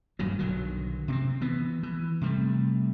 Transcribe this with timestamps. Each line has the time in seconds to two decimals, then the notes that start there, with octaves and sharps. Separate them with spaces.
0.19 D#1 G2 A#2 F#3
0.39 B1 D3 D#3 F#3
1.08 C3 B3 C4
1.41 E3 B3
1.83 E3
2.21 C3 G3 A3